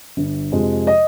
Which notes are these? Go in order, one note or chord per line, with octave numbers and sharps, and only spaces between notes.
G1
F2 C3 F3 G#3
D#5